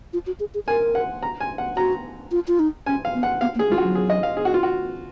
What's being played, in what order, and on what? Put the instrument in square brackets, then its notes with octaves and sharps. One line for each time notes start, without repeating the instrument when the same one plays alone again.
[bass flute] F4
F#4
G#4
G#4
[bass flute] A#4 [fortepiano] G#5
[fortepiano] F#5
A#5
G#5
F#5
[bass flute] F#4 [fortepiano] A#5
[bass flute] F4
F4
D#4
[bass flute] C#4 [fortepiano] G#5
[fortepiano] F5
[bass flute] B3
[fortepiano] F#5
[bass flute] B3 [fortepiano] F5
[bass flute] A#3
[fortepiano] G#4
[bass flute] G#3
[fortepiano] F4
F#4
[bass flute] F#3
[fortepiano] G#4
D#5
F5
G#4
F#4
F4
F#4